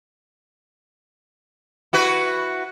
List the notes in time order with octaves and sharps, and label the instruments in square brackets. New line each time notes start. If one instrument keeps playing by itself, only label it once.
[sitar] E4 F#4 B4